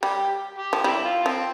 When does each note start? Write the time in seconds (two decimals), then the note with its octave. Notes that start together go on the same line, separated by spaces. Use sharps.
0.03 G3 G4
0.58 G4
0.73 F3
0.84 G3 C4 E4
1.05 F4
1.26 F3 C4